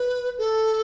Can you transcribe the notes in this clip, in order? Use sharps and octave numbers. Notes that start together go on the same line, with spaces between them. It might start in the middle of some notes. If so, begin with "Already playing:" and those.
Already playing: B4
A4